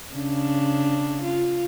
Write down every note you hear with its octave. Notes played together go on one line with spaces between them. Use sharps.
C#3 D4
F4